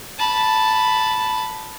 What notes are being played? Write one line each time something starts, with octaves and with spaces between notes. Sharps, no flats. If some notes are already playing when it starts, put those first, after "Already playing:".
A5 B5